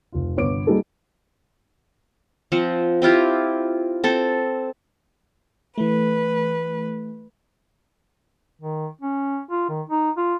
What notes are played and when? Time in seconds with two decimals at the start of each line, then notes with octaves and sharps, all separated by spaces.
0.12 F1 F4
0.37 G1 B3 C#5 D6 D7
0.67 G3 A#3 D#4 G#4 A4
2.52 F3 C4 F#5
3.02 C4 E4 F4 G4
4.04 C4 A4
5.78 E3 A3 B4
8.61 D#3
9.01 C#4
9.51 F4
9.69 D#3
9.89 D#4
10.17 F4